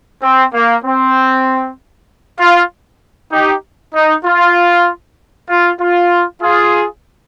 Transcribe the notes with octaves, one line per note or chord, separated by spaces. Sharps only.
C4
A#3
C4
F4
D#4 G4
D#4
F4
F4
F4
F4 G#4